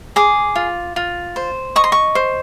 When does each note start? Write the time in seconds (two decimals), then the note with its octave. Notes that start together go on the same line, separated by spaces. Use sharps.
0.16 G#4 D6
0.56 F4
0.96 F4
1.36 C5
1.76 D#5 C#6
1.84 C6
1.92 C#6
2.15 C5